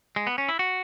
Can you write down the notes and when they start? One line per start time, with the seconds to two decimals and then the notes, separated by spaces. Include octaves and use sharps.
0.16 G#3
0.27 B3
0.38 C#4
0.49 E4
0.59 F#4